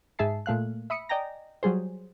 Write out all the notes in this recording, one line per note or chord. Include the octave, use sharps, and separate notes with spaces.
G#2 G#3 G#4 E5 A5 C7
A#2 A3 F5 F#6
E5 B5 D#6 C#7
D5 D#5 G5 G#5 A#5 A#6
F#3 G3 G#4 C5